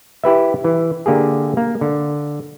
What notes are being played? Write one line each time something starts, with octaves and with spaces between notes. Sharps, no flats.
E4 G4 B4 E5
E3
D3 A#3 G4 G#4
A#3
D3